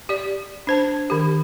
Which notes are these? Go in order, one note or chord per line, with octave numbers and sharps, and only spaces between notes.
G4 D5
D4 C5 A5
D#3 G4